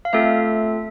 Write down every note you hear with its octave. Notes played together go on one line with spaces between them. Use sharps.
F5
A3 C4 F4 A4 E5